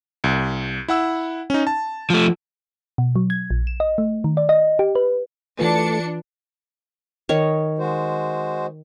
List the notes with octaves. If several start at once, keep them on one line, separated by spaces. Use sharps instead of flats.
C2
E4 F#5 E6
C#4 D#4
A5
F3 A3
B2
F#3
G#6
A#1
E7
D#5
A3
D#3
D5
D#5
G4
B4
E3 A3 D4 F4 B4 C#7
D#3 C#5
G#3 F#4 C5